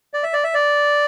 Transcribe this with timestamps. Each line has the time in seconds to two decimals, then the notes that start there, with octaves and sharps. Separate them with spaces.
0.14 D5
0.23 E5
0.33 D5
0.44 E5
0.54 D5